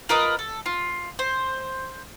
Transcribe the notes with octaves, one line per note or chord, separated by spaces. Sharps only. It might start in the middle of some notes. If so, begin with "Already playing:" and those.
F4 A#4 B4 D#5
A4
F4
C5